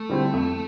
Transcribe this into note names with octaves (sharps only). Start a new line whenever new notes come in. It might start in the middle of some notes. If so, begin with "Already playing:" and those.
Already playing: A3
D3 G3 C4 E4
F2